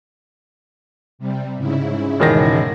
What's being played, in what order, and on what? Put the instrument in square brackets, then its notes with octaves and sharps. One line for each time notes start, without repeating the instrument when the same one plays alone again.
[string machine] C3 G3
G#2 C#3 E4
[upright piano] E1 D#3 A#6